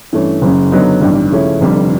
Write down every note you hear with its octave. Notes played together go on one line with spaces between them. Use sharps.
G2 E3 A3 C#4
F#1 F#2 C#3
D3 F#3 B3 D#4
A1 G2 D#3 G3
C#3 F3 A3 C#4 E4
F1 F2 D3 G3